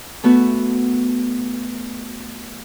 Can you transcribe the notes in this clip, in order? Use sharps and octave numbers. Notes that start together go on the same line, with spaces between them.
A3 B3 F#4